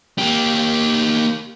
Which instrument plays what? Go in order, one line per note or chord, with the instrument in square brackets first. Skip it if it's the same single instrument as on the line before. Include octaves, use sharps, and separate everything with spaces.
[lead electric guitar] A#3 G4